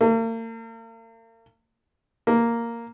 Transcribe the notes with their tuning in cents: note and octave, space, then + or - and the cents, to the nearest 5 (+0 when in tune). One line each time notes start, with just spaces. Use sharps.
A#3 -45
A#3 -5